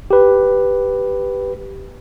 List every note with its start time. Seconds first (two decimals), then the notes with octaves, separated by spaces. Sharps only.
0.11 G4 B4